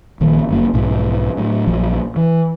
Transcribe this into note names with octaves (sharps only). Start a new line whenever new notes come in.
A#1 D#3 F3 A#3
G1 F#2 A#3
B1 G#2 F3
A2 F#3
A#1 F3 F#3
E3